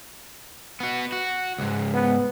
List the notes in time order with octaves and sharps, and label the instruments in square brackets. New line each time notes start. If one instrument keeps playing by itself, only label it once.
[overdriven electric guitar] B3 F#4
F#4
C#2 G#2
[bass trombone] B3